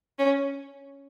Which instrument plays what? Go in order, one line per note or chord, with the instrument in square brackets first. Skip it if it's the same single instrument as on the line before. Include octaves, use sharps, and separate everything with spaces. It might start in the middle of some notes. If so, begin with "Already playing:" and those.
[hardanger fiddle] C#4